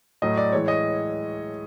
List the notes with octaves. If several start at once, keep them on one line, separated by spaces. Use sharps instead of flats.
A2 F#3 A3 D#5
D5
A2 E3 G#3 C#5
D#5